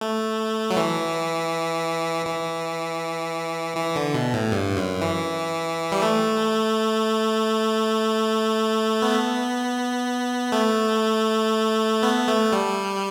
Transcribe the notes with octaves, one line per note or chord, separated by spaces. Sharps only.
A3
F#3
E3
E3
E3
D3
B2
A2
G2
F#2
E3
G3
A3
B3
A3
B3
A3
G3